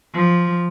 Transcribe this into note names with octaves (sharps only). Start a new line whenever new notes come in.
F3